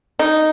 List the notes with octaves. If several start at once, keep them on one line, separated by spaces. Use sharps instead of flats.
D#4